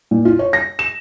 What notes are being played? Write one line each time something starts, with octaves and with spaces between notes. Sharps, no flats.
A#2
F4
C#5
A#6
E7